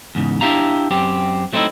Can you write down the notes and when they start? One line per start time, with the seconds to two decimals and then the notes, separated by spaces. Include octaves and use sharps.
0.15 E2 G#2 C#3
0.41 D4 E4 G4 F5 A#5
0.91 F#2 C4 G4
1.53 F#3 A3 C4 C#4 D#4 E4